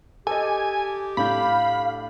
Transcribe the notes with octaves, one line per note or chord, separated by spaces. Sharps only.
G4 A4 D#5 G#5
A2 D4 F5 B5 G6